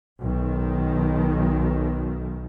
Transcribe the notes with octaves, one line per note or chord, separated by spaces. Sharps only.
B1 D#3